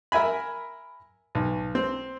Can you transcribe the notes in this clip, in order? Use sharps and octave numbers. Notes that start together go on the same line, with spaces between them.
A#4 E5 G#5 B5
B1
C4